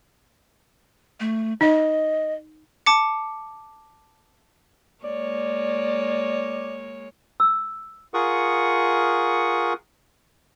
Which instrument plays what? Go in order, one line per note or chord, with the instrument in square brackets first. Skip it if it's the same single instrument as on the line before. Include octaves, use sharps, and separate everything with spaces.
[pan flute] A3
[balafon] D#4 [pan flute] D#5
[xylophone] A5 D6 C#7
[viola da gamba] G#3 A#3 C#5 [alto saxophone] D5
[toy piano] E6
[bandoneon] F4 G#4 A#4 F#5 C#6 D#6